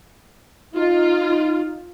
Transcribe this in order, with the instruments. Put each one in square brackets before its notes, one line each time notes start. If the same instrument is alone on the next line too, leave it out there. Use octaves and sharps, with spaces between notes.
[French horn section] D#4 [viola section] F4